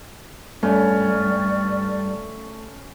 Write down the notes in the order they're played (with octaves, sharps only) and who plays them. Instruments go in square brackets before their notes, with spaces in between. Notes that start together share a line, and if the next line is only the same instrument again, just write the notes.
[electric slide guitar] G2 [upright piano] A3 [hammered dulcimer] C#4 [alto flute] D5